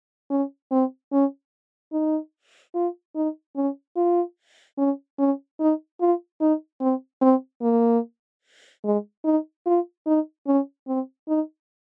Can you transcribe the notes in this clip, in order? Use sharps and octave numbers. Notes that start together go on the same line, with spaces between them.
C#4
C4
C#4
D#4
F4
D#4
C#4
F4
C#4
C#4
D#4
F4
D#4
C4
C4
A#3
G#3
D#4
F4
D#4
C#4
C4
D#4